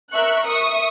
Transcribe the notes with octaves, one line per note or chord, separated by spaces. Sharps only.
A#4 E5 C#6 F#6
E5 C#6 D#6